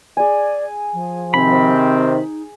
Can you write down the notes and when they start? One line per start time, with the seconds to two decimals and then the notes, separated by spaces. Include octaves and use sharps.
0.17 G#4 D5 G#5
0.93 F3
1.34 C3 D#3 C4 B5
1.75 D#4